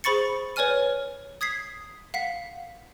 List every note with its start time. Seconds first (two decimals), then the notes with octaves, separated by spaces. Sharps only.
0.04 G#4 C5 B5 C#6 A6 C#7
0.56 B4 C#5 D5 G#5 F6 D#7
1.41 D#6 G#6 B6 C7
2.14 F5 F#5 B6